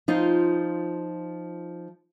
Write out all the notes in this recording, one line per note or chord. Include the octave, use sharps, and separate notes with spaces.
F3 D#4 F4